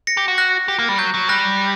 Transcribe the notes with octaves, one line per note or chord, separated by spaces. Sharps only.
A#6 C#7
G4
F#4
F#6 A#6
G4
A#3
G3
F#3 G6
F#3
G3 F#6 A#6